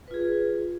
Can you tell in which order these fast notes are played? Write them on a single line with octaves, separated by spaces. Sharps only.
B4 F4 G#4